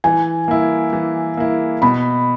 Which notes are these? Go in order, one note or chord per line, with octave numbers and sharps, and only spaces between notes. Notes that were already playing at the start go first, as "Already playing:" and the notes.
E3 G#5
A#3 E4
E3
A#3 E4
B2 B5